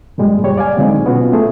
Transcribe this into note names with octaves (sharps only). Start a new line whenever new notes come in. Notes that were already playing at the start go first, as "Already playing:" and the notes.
F#2 A#2 G3 G#3
C#2 G3 C#5
D5 F5 G#5
A#2 D3 F#3 G#3 C4 D#4
B2 B3 C#4 F4 F#4
A3 G#4